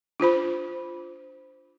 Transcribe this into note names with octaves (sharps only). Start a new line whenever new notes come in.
D4 F4 C5 B5